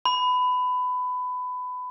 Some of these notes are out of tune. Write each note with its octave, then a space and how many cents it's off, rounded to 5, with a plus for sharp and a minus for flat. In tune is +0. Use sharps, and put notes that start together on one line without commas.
B5 +20